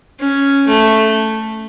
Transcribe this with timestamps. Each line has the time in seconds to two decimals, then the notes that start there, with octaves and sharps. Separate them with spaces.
0.20 C#4
0.67 A3